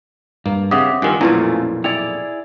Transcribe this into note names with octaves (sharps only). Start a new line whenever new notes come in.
G2 A#3
G2 C#3 C4 E5 F#5 D6 D#6
G2 D#3 F4 A#4 G#5
B1 F2 A#2 A3 C#4 E4 F4 B4
E4 G#4 D5 G5 F7